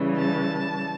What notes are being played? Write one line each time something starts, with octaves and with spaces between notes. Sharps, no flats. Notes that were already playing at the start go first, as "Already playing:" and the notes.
Already playing: C#3 E3 G3
A5